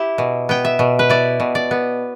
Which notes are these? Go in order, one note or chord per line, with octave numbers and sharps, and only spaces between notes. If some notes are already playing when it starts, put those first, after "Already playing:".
Already playing: E4 G4
B2
B3 G5
E5
B2
B4
E4 D5
B2
D5
B3